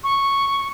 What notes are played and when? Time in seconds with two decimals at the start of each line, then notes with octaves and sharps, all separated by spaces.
0.04 C#6